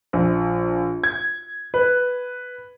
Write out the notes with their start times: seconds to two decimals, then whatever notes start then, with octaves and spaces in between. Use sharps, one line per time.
0.13 A#1
1.04 G#6
1.74 B4